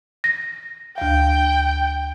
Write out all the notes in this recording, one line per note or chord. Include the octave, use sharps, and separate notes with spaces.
A#6
D2 F5 G5